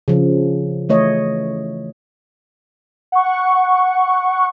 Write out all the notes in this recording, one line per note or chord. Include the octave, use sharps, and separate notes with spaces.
C#3 F3
E3 A3 C#5 D#5
F#5 C#6